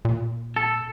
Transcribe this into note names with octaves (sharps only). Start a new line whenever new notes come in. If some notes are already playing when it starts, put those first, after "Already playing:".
A#2
A4